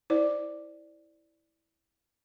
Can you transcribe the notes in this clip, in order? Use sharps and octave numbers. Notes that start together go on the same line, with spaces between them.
E4 C5 D5